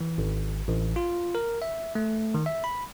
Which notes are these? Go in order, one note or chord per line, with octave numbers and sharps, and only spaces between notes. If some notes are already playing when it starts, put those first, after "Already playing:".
E3
G#1
A1
F4
A#4
E5
A3
D#3
E5
B5